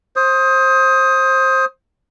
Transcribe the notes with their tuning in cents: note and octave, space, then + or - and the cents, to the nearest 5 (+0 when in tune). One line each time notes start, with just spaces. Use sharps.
C5 +20 D#6 +15